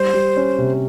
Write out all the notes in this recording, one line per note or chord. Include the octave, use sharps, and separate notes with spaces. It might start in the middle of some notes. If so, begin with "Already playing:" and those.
Already playing: G3 C5
G3
C#4
C3